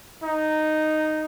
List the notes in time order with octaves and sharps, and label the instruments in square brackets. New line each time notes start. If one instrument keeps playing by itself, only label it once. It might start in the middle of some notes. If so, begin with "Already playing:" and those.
[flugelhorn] D#4